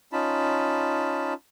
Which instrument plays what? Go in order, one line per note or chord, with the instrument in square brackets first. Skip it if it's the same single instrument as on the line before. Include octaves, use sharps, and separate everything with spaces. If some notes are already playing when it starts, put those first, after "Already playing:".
[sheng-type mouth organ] C#4 D#4 F4 A5 B5